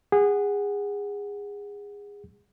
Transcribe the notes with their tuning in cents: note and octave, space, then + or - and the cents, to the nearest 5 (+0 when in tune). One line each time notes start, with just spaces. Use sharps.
G#4 -25 F#5 +0